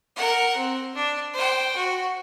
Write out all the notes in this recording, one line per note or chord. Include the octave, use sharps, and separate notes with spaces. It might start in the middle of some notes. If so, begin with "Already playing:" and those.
A#4 F#5
C4
D4
C5 G5
F#4